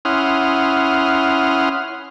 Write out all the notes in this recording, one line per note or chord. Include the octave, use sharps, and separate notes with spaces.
C#4 E4 F#5 C6 D#6 F6